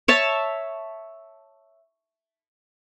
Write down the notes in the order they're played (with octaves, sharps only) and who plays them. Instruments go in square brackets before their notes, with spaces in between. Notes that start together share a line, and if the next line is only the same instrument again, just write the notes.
[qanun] C#5 E5 A5